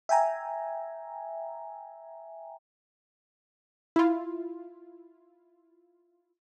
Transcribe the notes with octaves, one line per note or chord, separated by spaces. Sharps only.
E5 G5 G#5 A#5
E4 F4